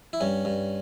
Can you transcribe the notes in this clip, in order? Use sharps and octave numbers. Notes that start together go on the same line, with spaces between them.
E4
G2 C#4
G2